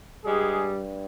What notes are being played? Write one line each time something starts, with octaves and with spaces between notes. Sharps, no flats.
G2 G3 G#3 G#4